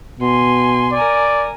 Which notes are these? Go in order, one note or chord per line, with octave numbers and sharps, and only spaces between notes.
B2 G#5 C6
A#4 D5 G#5